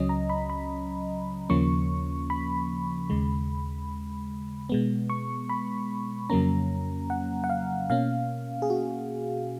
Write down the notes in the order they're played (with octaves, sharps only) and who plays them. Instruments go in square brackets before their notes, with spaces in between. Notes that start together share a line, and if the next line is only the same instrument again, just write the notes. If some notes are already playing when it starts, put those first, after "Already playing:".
Already playing: [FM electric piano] C#2 C#3 F#3 C#4 D#5
A#5
B5
B5
D#2 C#3 F3 A#3 C#4 C#6
B5
D#2 C#3 G#3
B2 G#3 B3
C#6
B5
F2 C#3 F#3 A#3 C#4 A#5
F#5
F#5
F5
B2 A#3 C#4 F5
G#4
F#4